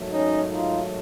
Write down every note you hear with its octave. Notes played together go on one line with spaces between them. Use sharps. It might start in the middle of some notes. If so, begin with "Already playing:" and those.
Already playing: G#2 D#3 F#3 A3
C#4 D#4
D#4 F4